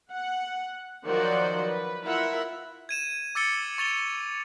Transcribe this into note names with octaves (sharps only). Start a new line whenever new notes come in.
F#5
D#3 F3 F#3 C5 D5 F#5
B4
E4 F4 A#4 E5 F#5
G#6 D#7 E7
D6 E6 A6 C#7 G7
C#6 A6 F7 G7